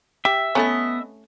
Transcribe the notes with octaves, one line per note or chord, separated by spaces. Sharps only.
G4 E5
A3 B3 C#4 D#5